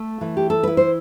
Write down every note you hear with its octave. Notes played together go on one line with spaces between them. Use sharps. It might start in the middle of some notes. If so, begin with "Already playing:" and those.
Already playing: A3
E3
G4
A4
E4 B4
C5